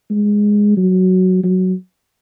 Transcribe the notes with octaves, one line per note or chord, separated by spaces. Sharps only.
G#3
F#3
F#3